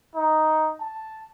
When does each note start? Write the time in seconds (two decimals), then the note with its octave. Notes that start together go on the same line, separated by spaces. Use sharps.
0.16 D#4
0.81 A5